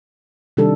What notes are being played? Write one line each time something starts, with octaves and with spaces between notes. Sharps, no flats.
C3 D#3 G3 D4 A4